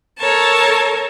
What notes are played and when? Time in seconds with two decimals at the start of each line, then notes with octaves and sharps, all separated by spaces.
0.19 A4 A#4 C#5 A5